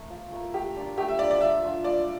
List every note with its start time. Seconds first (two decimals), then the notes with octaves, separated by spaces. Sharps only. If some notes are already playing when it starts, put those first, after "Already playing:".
Already playing: A3 C4 A#4
0.10 F3
0.32 A3 E4 A#4
0.53 A3 G4
0.75 D4 F4 A#4
0.97 A3 G4
1.08 E5
1.19 D4 F4 A#4 D5
1.31 D5
1.40 F3 E5
1.62 A3 D4 F4
1.84 F3 D5